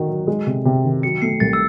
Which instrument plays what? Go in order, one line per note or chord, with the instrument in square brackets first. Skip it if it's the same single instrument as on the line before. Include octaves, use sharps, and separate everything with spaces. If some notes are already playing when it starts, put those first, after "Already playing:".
Already playing: [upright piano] D#3 F#4
F#3
G#3
C3
C3
D#3
[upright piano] F#3 [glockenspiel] C#7
[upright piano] A3 [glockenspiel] C7
[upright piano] C2 [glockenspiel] A6
[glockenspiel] E6